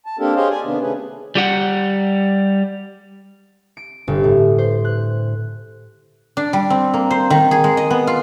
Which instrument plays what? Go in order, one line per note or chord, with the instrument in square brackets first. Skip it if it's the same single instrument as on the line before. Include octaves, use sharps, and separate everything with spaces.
[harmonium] A5
A#3 C4 D4 G4 A4 A#4
G4 G#4 C5 C#5 D#5 F5
D5 G#5
C3 D#3 B3 D4
C3 A3 C#4 G#4 B4
[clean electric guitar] G3 G4 F#5
[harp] D7
G1
A2
C5
F#6
[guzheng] D4
G3
C4
A#3
C5
D#3
G#4
G#3
D#5
B3
F4